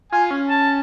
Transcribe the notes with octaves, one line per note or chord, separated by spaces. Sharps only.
F4 G#5
C#4
A5